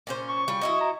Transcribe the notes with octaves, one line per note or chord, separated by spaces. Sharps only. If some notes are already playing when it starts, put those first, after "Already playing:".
A#2 C#4 C5
C#6
G3 F4
E4 F#4 D#5
A#5